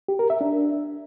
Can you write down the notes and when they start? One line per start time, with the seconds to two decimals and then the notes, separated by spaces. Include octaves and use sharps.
0.08 G4
0.19 A#4
0.30 E5
0.41 D4